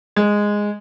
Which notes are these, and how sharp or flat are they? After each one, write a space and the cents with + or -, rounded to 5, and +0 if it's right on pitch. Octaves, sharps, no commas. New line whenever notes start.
G#3 -5